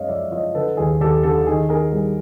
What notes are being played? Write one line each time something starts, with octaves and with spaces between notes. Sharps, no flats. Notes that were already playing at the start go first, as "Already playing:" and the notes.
Already playing: F#2 G#3 C#5 D#5 F5
F3 D5 E5
F3 C#5 D#5
D3 A4 B4
D#2 G#4
D#2 G4 A4
D3 G4 A4
D#3 G#4
D#3 G#4 A#4
G3 G#4